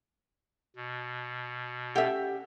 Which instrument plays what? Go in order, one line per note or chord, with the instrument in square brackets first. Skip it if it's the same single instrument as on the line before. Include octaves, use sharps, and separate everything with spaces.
[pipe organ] B2
[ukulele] C#4 A4 F#5 [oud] G4 E5